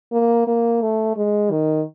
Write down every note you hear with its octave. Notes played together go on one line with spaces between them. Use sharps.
A#3
A#3
A3
G#3
D#3